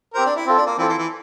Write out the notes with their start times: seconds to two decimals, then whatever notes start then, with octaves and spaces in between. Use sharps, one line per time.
0.14 C4 G4 A#4 C5
0.26 D4
0.36 E4
0.46 C4 F4 A4
0.57 D4
0.67 A#3
0.78 E3 C4 F4 A4
0.89 E3
0.99 E3